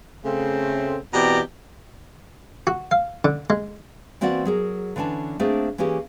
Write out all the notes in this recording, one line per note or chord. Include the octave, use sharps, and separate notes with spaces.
C#3 A3 C4
B2 E3 C4 G4 D5 A#5
F#4
F5
D3
G#3
E3 A#3 C4 F#4 D5 F#5
F#3 G#4 A#4
D3 E3 C#4 D4 A5
A3 A#3 C4 D4 G#4
E3 A#3 C#4 G4 G#4